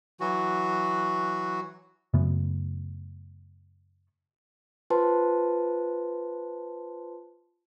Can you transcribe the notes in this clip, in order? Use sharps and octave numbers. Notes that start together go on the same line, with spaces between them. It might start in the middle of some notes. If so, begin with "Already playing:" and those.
E3 F#3 F#4
F#2 C#3 A3 B3
F4 B4 C5 A5 C6